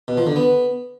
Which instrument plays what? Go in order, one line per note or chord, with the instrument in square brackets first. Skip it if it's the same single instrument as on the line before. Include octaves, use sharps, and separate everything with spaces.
[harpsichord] B2
F3
D3
B3